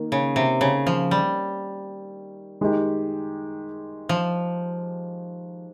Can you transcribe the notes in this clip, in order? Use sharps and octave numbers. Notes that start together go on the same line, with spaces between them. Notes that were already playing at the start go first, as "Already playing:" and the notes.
Already playing: D#3 A#3
C#3
C3
C#3
F3
G3
D#3 G#3 D#4 G4
F3